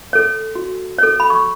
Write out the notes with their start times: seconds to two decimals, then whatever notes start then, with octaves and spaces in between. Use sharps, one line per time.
0.13 A4 C#5
0.55 F#4
0.98 A4 C#5
1.20 B5
1.30 C#6